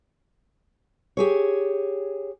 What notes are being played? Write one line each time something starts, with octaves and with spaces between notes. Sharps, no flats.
G4 G#4 C#5